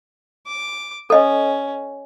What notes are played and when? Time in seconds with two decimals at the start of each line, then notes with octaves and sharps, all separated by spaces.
0.47 D6
1.10 C#4 A4 D#5